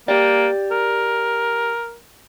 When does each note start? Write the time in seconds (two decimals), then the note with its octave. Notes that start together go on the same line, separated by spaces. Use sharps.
0.08 A#3 G4 D5
0.71 A#4